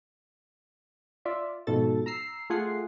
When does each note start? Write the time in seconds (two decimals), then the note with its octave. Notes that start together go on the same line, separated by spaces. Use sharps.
1.25 F4 D5 E5
1.67 G#2 B2 F3 A4 A6
2.06 A#5 E6 C7
2.50 A3 F4 G#4 F#5 C7